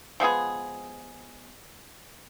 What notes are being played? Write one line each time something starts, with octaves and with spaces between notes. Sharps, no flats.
F3 G#3 B3 G#4